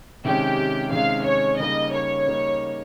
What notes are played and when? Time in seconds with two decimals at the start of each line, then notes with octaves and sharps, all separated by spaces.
0.25 C3 D#3 G#3 C#4 G4
0.92 C3 D#3 G#3 C#4 F5
1.26 C#5
1.59 C#3 G3 A#3 D#4 D#5
1.92 C#5
2.27 C#3 G3 A#3 D#4